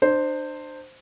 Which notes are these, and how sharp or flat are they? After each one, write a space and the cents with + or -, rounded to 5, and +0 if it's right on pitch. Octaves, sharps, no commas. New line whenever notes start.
D4 +40 C5 +0